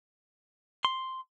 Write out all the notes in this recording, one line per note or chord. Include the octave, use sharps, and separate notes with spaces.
C6